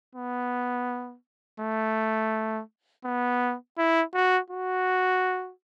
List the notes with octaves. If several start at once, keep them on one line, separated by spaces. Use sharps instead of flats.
B3
A3
B3
E4
F#4
F#4